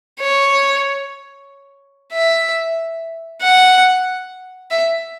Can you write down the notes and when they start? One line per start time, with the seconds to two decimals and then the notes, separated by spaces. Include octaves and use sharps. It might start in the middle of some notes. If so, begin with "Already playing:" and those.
0.20 C#5
2.12 E5
3.41 F#5
4.71 E5